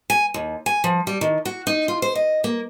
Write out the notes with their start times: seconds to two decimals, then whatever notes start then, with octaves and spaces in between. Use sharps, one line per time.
0.10 G#5
0.34 D#2
0.66 G#5
0.84 F3
1.07 G3
1.21 D#3
1.45 F#4
1.67 D#4
1.88 F4
2.02 C5
2.15 D#5
2.44 A#3